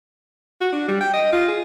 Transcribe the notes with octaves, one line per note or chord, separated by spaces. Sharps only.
F#4
D4
G3
G5
D#5
F4
G#4